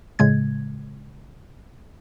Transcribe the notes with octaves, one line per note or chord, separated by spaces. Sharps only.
A2 C#3 G#3 G#6